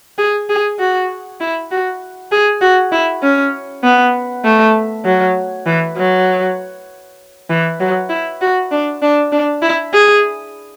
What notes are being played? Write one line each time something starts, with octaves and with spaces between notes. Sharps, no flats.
G#4
G#4
F#4
E4
F#4
G#4
F#4
E4
C#4
B3
A3
F#3
E3
F#3
E3
F#3
E4
F#4
D4
D4
D4
E4
G#4